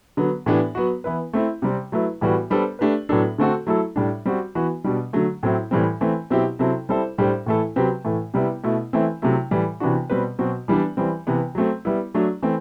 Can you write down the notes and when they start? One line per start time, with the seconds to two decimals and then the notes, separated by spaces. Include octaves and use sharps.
0.17 D3 F#3 B3
0.46 A2 E3 B3 D4 G4
0.75 F#3 B3 F#4
1.04 E3 B3 E4 B4
1.33 A3 C4 E4
1.62 C3 G3 C4
1.92 F#3 A3 E4 B4
2.21 A2 E3 G3 B3 F#4
2.50 G3 B3 D4 A4 C5
2.79 A3 D4 G4 B4
3.09 A2 F#3 B3 D4 A4
3.38 D3 A3 C4 F#4 A4
3.67 F#3 A3 E4 A4
3.96 A2 G3 D4
4.26 G3 C4 F#4
4.55 E3 B3 F#4
4.84 B2 G3 D4
5.13 D3 F#3 A3
5.43 A2 F#3 C4 E4
5.71 A2 E3 G3 C4
6.01 E3 A3 C4
6.30 B2 F#3 C4 E4 G4
6.59 C3 F#3 C4 E4 A4
6.89 G3 C4 E4 A4 C5
7.18 A2 G3 D4 G4 C5
7.46 A2 E3 A3 E4 A4
7.76 C3 F#3 C4 G4 B4
8.05 A2 E3 A3
8.34 C3 G3 B3 E4
8.64 B2 A3 E4
8.93 E3 A3 C4 E4
9.22 C3 F#3 A3 E4
9.51 A2 E3 G3
9.80 C3 E3 B3 D4 F#4
10.10 B2 G3 C4 G4 B4
10.39 B2 F#3 C4 F#4
10.68 E3 G3 B3 D4
10.97 E3 G3 C4
11.27 C3 E3 B3
11.55 F#3 A3 C4
11.85 G3 B3 E4
12.14 F#3 A3 D4
12.43 E3 A3 C4